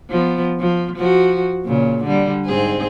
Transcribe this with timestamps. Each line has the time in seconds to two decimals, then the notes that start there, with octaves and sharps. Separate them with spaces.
0.10 F3 B3
0.60 F3
0.97 F3 F#4
1.65 A#2 C#3
2.04 D3 G3
2.46 G#2 C4 G#4